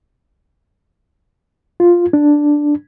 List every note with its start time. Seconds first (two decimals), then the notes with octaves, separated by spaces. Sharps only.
1.80 F4
2.13 D4